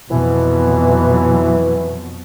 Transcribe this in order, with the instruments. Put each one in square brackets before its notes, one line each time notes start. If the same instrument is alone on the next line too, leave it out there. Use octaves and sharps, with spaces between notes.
[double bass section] F2 B2 F#3 [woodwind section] E3